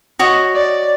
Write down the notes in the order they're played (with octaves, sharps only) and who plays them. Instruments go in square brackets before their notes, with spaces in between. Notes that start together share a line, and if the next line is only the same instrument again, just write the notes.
[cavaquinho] F#4 C#5 D#5
[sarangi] D5